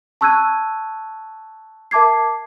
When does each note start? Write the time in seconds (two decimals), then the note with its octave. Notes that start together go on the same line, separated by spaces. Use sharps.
0.21 A5 C#6 E6 F#6 G#6 D#7
1.91 A#4 E5 A5 D6 G#6 C7